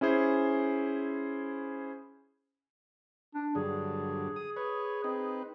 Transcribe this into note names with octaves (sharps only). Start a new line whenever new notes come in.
C#4 E4 G#4 C5
D4
G2 D3 F#3 G#4
D#6
B4 C#5
C4 D#4 B4